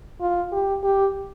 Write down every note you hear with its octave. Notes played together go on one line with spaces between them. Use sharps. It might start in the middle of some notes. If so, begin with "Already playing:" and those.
F4
G4
G4